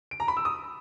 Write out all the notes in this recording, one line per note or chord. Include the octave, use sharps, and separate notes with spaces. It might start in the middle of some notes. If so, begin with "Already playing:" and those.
D7
A#5
B5
E6
D#6